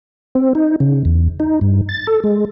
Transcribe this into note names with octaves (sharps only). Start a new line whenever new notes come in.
C4
D#4
C#3
E2
D#4
G2
A6
A4
G#3